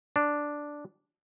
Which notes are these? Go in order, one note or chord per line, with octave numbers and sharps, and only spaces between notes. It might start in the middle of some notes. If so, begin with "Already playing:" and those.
D4